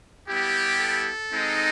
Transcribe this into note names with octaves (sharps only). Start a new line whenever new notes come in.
G3 B3 E4 G4
A4
G#3 C4 D#4